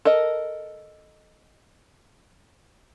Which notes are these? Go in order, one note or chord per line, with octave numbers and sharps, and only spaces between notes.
A4 A#4 D#5